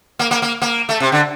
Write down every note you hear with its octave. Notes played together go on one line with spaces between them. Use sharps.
A#3
A#3
A#3
A#3
A3
C3
D3